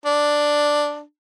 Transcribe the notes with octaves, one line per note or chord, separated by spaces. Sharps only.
D4